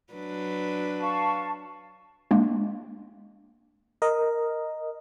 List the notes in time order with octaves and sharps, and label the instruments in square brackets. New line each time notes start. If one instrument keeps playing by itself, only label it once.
[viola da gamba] F#3 D4 B4
[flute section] F5 A5 C#6
[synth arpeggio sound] G#3 A#3 D4
[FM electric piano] A#4 D#5